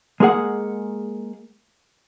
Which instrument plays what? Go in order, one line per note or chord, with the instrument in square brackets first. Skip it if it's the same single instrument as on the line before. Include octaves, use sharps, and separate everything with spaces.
[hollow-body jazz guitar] G#3 A#3 G#4 F#5